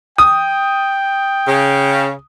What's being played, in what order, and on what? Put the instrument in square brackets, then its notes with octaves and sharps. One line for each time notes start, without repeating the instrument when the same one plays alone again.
[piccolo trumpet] G5 [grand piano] D#6
[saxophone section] C#3